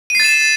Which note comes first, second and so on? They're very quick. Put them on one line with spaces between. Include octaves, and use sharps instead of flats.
D#7 C7 A6 E7